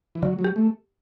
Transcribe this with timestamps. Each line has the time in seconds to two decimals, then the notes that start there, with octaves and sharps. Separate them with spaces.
0.15 E3
0.22 D3 F#3
0.39 F#3
0.44 G4
0.56 A3